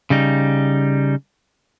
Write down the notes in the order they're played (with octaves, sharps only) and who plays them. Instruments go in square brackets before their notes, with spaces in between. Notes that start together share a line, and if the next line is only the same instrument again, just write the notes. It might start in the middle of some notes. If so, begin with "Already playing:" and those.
[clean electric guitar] C#3 G3 D#4